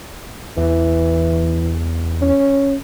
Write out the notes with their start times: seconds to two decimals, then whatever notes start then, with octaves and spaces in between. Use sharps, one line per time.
0.57 E2 E3
2.21 C#4